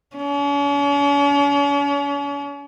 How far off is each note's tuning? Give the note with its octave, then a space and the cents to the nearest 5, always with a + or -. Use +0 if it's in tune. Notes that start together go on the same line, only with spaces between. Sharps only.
C#4 +45